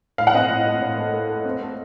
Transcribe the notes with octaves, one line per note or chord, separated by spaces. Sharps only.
A2 F5
F#5
C4 D#5 F5
A2
A3
A2
A3
A3
A3
C4
A3